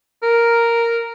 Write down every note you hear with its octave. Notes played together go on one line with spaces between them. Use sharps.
A#4